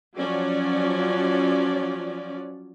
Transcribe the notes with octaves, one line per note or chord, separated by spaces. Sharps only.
F3 F#3 C#4 D5